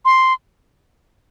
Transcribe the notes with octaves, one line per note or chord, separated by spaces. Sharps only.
C6